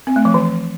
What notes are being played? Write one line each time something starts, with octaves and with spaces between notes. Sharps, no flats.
C4
A3
F3
E3